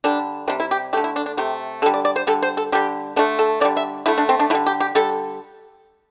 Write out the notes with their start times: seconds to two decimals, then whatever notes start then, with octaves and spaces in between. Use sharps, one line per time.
0.04 D3 G3 D4
0.48 C3 G3 D4
0.60 E4
0.71 G4
0.93 A3 G4
0.97 D3
1.04 E4
1.16 D4
1.26 D4
1.37 C3 A3 G4
1.82 D3 A4
1.86 G3
1.94 D5
2.05 D5
2.16 C5
2.27 D3 G3 A4
2.42 C5
2.57 A4
2.72 D3 G3 G4
3.16 D3 A3 D4
3.39 A4
3.61 D3 D5
3.65 G3
3.77 E5
4.06 D3 A3 E4
4.18 D4
4.29 C4
4.40 D4
4.50 D3 G3 E4
4.66 G4
4.80 G4
4.95 D3 G3 A4